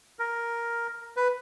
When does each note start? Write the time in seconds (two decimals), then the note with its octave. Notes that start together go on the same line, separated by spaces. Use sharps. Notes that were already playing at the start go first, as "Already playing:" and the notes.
0.19 A#4
1.17 B4